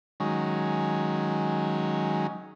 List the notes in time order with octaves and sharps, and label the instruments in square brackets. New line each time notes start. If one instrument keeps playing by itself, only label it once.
[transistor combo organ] D#3 F#3 G#3 C#4